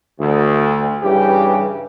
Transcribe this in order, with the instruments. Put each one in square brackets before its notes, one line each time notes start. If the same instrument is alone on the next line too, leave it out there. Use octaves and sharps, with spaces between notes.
[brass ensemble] D2
G2 C#3 E3 G4